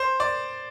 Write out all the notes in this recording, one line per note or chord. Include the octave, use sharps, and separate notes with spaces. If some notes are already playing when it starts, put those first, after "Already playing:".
Already playing: C5
D5